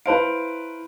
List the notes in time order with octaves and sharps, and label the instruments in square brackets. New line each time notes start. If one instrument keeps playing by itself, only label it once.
[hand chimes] E4 D7 [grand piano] B4 C5 F5